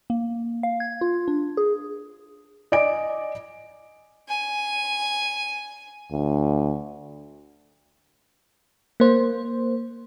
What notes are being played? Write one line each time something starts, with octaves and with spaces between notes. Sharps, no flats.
A#3
F5
G#6
F4
D4
G#4
D5 D#5 G#5 D7
G#5
D2
A#3 C5